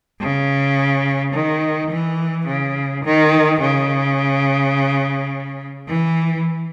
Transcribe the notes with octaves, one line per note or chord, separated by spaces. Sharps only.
C#3
D#3
E3
C#3
D#3
C#3
E3